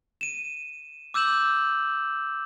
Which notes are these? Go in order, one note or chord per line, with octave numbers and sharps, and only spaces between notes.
D#7 E7
D6 E6 G6 E7 F#7